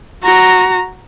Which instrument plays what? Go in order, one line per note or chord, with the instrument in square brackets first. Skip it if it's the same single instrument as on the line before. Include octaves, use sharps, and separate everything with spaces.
[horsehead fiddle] F#4 A#5